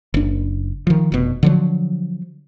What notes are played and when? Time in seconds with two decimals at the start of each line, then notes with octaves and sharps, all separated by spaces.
0.14 F#1 D4
0.87 D#3 F3
1.12 F1 B2
1.43 D3 F3 F#3